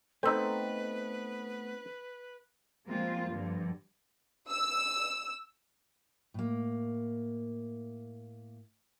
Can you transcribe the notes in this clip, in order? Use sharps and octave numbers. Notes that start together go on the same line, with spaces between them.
A3 B3 C4 D#4 A4 B4 E6
F3 G3 G#3 A#3 C4 F4
G2 D3 F3
E6
A2 A#3